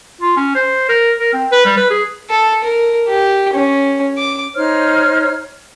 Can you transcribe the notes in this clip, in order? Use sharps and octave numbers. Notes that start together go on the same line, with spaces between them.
F4
C#4
C5
A#4
A#4
C4
B4
G3
B4
G#4
A4
A#4
G4
C#4
D6
D#4 C5 C#5 F6